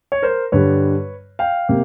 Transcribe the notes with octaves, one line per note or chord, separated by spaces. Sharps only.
C#5
A#4 C5
G2 D3 G3 B4 C#5
F5 G5
C3 A#3